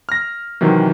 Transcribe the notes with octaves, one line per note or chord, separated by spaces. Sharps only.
F6 A#6
C3 D#3 E3 F#3